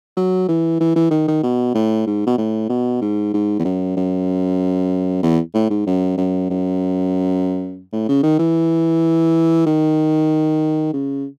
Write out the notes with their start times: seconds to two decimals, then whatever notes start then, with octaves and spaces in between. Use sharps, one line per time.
0.17 F#3
0.48 E3
0.80 E3
0.96 E3
1.11 D#3
1.28 D#3
1.43 B2
1.75 A2
2.07 G#2
2.27 B2
2.38 A2
2.70 B2
3.02 G#2
3.34 G#2
3.59 E2
3.65 F#2
3.97 F#2
5.23 E2
5.54 A2
5.71 G#2
5.87 F#2
6.18 F#2
6.50 F#2
7.93 A2
8.09 C#3
8.23 D#3
8.39 E3
9.66 D#3
10.93 C#3